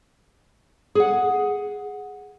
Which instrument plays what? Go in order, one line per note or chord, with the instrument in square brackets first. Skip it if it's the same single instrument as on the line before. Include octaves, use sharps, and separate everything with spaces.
[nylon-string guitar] G#4 F#5